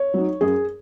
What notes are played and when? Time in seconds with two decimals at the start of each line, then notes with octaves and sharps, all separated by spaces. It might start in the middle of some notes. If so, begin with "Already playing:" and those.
Already playing: C#5
0.14 F#3 D#4
0.41 F#2 G#4